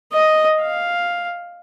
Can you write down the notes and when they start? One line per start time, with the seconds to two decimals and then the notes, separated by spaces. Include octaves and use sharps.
0.13 D#5
0.61 F5